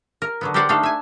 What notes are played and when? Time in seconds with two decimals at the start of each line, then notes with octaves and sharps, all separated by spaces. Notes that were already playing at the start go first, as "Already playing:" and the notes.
0.22 A#4
0.41 D3 F#3 B3
0.54 G4 A4 A#4 C5 D5 F#5
0.69 A3 D4 D#4 A4 F5
0.83 E5 G#5